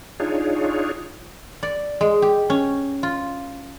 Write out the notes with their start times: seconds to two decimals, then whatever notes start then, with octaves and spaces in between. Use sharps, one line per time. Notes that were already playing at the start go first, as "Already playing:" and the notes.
0.20 D4 D#4 F4 G#4 C#5
1.63 D5
2.01 G#3
2.22 G4
2.50 C#4
3.03 F4